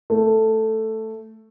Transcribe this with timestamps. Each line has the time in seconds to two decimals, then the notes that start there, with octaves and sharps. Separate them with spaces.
0.10 A3